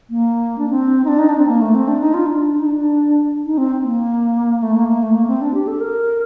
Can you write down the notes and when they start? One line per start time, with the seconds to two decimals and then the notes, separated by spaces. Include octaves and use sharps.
0.10 A#3
0.58 D4
0.70 C4
1.04 D#4
1.08 D4
1.19 D#4
1.29 D4
1.38 C4
1.47 A#3
1.61 A3
1.75 C4
1.88 D4
2.00 D#4
2.14 F4
2.26 D4
2.59 D#4
2.66 D4
3.45 D#4
3.58 C4
3.83 A#3
4.62 A3
4.76 A#3
4.88 A#3
5.02 A3
5.15 A#3
5.27 C4
5.41 D4
5.54 G4
5.67 A4
5.80 A#4